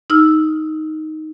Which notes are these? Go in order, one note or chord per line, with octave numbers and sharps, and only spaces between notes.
D#4 E6 F6